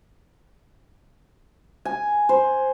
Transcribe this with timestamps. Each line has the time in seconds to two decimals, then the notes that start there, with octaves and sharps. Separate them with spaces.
1.85 G#5
2.29 C5